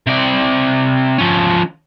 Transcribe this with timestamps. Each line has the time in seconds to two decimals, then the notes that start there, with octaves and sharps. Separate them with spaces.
0.07 C3 D5
1.18 F3 C#4